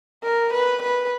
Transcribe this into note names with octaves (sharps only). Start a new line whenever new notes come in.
A#4
B4
B4